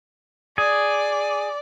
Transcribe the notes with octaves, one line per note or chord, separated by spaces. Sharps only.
G#4 D5